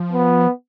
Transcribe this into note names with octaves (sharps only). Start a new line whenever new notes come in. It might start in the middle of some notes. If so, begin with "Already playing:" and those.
Already playing: F3
B3